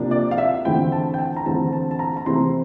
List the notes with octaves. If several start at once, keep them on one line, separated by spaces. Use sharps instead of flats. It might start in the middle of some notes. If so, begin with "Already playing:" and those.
Already playing: C3 F3 A#3 D4
D5
F5
E5
E2 D3 A3 C4 E4 G5
A5
G5
A5
A#5
E2 D3 A3 C4 E4 A5
A5
A5
A#5
A#5
C3 E3 A3 C4 E4 C6